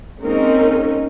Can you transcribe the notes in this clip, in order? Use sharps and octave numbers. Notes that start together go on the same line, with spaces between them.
G#3 A#3 C4 C#4 D#4 A#4